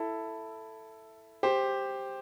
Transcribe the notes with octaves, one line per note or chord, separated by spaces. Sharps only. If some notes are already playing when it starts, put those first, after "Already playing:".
Already playing: E4 A4
G4 C5